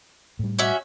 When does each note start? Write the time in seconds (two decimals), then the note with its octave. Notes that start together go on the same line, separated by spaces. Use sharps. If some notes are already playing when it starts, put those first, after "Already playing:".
0.39 A2 G3
0.59 C#4 F#4 E5